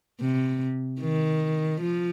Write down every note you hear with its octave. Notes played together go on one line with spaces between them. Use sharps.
C3
D#3
F3